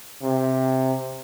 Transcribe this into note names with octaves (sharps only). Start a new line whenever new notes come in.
C3